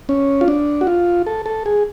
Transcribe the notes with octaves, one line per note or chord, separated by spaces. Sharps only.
C#4
F4
D4
F#4
F4
A4
A4
G#4